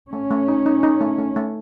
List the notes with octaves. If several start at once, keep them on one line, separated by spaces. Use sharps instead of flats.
A3 C#4
A3
D#4
D#4
D#4
A3
A3
A3